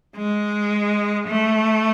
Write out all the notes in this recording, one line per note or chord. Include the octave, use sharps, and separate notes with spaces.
G#3
A3